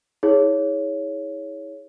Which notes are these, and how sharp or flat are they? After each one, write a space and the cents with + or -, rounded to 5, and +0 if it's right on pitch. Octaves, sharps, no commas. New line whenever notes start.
E4 -45 G#4 +0 C#5 +10